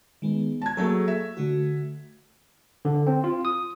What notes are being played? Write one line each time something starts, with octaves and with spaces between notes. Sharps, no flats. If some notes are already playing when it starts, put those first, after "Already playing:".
D#3 G#3 B3
A5 G#6
F#3 A3 A#3 G#4
E5
D3 A3 F#4
D3
C4
F4
D#6